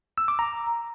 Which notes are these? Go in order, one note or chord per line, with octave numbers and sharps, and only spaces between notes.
E6
D6
A#5